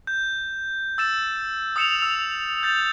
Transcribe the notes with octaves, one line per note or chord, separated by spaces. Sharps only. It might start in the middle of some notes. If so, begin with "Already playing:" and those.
G6
E6 A6 E7
D#6 E6 C#7 E7 F7
E6
G6 A6